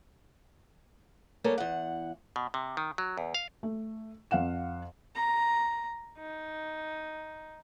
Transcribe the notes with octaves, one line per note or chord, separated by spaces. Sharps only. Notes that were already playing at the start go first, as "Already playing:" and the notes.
G3 A#3 B3 G#4 A4 C#5
E2 F#5
B2
C3
D#3
F#3
E2
F5
A3
F2 F5 F#5 E7
A#5
D#4